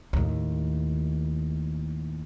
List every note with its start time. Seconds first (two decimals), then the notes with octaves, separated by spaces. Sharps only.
0.13 D#2 A2